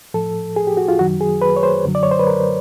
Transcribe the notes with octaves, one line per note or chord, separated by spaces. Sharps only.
A2 F3 A4
G#4
G4
F#4
F4
F#2 D#3 F#3 F#4
G#4
B4
C#5
C5
F#2 D3 F#3
D5
C#5
C5
B4
A#4